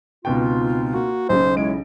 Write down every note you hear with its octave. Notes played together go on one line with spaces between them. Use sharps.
C#2 B2 C4 D#4 F4 G5
A#3 F#4
B1 C#3 C5
G#3 E4 C#5 D7